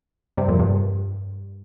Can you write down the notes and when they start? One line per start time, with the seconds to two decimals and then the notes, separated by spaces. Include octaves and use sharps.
0.37 G2 C3
0.48 F2 A#2
0.59 G2